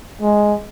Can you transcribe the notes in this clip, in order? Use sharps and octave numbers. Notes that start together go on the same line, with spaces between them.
G#3